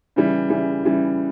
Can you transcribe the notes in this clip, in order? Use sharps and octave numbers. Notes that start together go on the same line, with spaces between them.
C#3 E3 G3
C#3 E3 G3
C#3 E3 G3